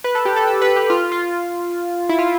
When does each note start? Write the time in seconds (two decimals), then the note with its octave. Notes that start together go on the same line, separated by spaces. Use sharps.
0.04 B4
0.15 A4
0.25 G4
0.36 A4
0.47 A4
0.62 B4
0.76 G4
0.90 F4
1.12 F4
2.09 E4
2.19 F4